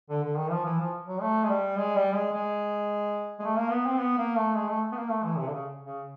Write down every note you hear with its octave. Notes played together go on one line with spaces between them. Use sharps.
D3
D3
D#3
F3
E3
F3
F#3
A3
G#3
G3
G#3
G3
G#3
G#3
G#3
A3
A#3
B3
C4
B3
A#3
A3
G#3
A3
B3
A#3
A3
E3
C3
D3
C#3
C#3